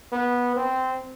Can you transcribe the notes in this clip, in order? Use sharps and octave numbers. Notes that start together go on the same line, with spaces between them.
B3
C4